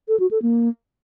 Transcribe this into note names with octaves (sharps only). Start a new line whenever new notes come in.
A4
F#4
A4
A#3